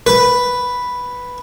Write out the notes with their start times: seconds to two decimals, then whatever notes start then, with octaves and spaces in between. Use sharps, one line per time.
0.07 B4